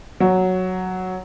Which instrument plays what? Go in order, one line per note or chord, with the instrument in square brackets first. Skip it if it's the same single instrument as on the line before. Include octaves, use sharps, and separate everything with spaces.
[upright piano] F#3